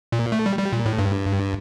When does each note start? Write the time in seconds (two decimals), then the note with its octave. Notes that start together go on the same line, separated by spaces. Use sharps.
0.12 A#2
0.32 A3
0.46 G3
0.59 G3
0.72 A#2
0.86 A2
0.98 G2